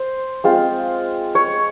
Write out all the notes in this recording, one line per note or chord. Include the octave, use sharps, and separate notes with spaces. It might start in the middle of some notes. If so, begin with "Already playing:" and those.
Already playing: C5
G#3 C4 F4
C#5